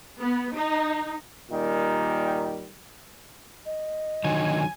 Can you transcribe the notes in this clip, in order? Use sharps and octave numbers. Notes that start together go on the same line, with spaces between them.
B3
D#4
A#2 D#3 G3
D#5
D3 D#3 F#3 G#5